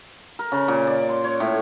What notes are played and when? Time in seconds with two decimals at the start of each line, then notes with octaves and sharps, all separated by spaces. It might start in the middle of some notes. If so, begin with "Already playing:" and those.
0.39 A#4
0.52 C#3
0.68 A#2
0.87 D5
1.09 C6
1.24 C#5
1.40 A2